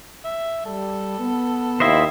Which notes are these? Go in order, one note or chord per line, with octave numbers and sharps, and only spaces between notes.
E5
G3 A4
B3
D#2 E4 C5 D#5 E5